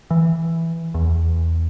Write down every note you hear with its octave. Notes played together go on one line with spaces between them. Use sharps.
E3
E2